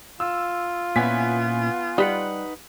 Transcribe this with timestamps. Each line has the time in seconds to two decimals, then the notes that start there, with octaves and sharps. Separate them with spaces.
0.20 F4 E6
0.96 A#2 B3 C#4 E4 G#5 B6
1.98 G3 D#4 B4 F#5